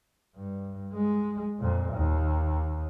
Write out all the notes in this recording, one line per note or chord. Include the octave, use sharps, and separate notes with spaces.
G2
G#3
F2 A#2
D#2